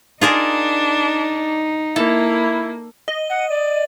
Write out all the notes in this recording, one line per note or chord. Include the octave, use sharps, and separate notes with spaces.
D4 D#4 F4 G#4 A#4
A#3 E4 A4
D#5
F#5
D5